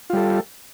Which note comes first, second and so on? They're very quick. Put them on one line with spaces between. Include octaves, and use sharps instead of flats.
F4 G3 A4